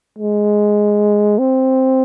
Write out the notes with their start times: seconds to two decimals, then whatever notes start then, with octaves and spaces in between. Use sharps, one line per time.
0.18 G#3
1.39 C4